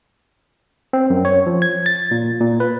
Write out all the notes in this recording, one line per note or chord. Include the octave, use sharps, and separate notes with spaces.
C4
F#2
C#5
F3
G#6
A6
A#2
A#2
B4